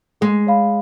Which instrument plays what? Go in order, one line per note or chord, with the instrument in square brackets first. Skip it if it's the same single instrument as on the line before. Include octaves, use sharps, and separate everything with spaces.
[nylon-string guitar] G#3 [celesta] G#4
[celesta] C#5 F5 B5